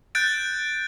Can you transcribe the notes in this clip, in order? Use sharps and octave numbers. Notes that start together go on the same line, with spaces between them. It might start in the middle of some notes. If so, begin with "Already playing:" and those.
F#6 G6 A6 D7